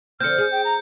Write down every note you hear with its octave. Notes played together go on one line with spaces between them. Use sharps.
D3 F3 C4 F6 G6 C#7
G#4
G5
A#5